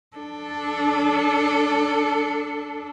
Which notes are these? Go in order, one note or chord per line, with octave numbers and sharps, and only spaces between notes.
D4 A4